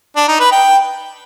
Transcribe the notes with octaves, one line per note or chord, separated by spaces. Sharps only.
D4
D#4
B4
G5